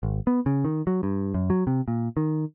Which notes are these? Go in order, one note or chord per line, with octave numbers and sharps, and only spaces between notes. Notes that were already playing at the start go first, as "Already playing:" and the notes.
G#1
B3
C#3
D#3
F#3
G2
F#2
F#3
C3
A#2
D#3